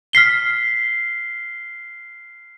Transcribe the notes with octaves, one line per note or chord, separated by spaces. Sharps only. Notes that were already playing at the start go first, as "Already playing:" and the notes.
F6 B6 C7 G7